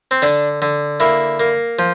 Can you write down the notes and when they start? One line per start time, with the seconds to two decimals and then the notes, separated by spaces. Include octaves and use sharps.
0.11 C4
0.22 D3 D4
0.62 D3
1.00 A#3 E4
1.40 A#3
1.79 F3